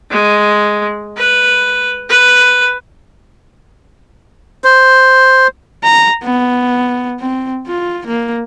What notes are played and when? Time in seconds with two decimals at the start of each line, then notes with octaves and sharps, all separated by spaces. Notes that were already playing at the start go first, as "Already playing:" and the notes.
0.11 G#3
1.17 B4
2.09 B4
4.64 C5
5.84 A#5
6.23 B3
7.20 C4
7.67 F4
8.07 A#3